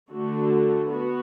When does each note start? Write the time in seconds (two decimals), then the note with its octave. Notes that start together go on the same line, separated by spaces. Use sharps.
0.10 D3 A3 F#4 A4
0.89 B3 F#4